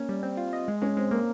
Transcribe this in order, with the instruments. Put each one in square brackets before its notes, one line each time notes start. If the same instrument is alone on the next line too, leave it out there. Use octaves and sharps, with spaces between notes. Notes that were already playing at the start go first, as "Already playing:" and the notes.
Already playing: [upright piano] A#3 [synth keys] C#4
[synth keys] G3
C4
F4
D#5
G#3
[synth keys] G#3 [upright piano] C#4
[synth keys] G#3 [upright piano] C4
[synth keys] A#3 [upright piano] A#4